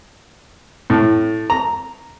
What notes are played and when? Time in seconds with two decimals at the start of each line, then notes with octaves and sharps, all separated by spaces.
0.90 A2
1.50 A#5